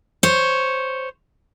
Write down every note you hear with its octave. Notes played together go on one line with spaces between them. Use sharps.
C5 C#5